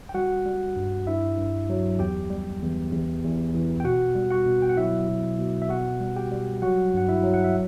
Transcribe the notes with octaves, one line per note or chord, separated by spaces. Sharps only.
G5
G3 F#4 F#5
G3
G2
G2 E4 E5
G2
F#3
E2 G4 G5
G3
E2
E2
E2
E3
G5
B2 F#4 F#5
G3
F#4 F#5
B2
G5
F#5
F#3 E4 E5
B2
B2
E5
B2 F#4 F#5
G3
G4 G5
G3
F#3 F#4 F#5
G2 F#5
E4 E5
F#3
F#5
E5